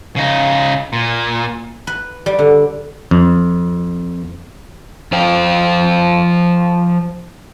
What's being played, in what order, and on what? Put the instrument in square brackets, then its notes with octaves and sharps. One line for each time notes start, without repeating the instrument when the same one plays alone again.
[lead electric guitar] C#3 D#4
A#2
[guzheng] B4
G3
D3
[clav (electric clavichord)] F2
[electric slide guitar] F3 C5 F5 G5